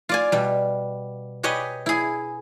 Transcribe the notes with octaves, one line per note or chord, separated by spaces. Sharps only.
F4 D5 G#5
B2 G3
G4 B4 C#5 D#5 G#5
E4 G#4